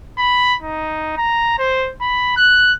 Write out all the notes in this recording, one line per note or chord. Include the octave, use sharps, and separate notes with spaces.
B5
D#4
A#5
C5
B5
F#6